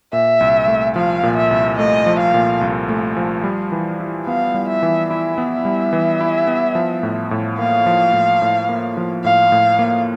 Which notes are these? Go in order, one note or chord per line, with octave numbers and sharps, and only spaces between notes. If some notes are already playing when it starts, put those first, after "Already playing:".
A#2 E5
C2
A3
F3 F5
A#2
E5
C2
A3 D#5
F3
F5
A#2
C2
A3
F3
G3
E3
E4
B3 F5
G3
E5
E3
E4 E5
B3
E5
G3
E3
E4
B3
F3
A2
A2
A#3 F5
F3
A2
A2
A#3
F3
A2 F5
A2
A#3